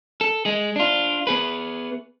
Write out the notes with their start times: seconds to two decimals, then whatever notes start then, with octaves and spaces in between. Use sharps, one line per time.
0.21 A4
0.45 G#3 G#4
0.76 D4 F4
1.27 B3 G#4 B4